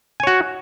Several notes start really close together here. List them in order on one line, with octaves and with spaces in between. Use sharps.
G#5 C#5 F#4